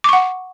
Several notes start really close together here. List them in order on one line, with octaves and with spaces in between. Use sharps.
D6 C#6 F#5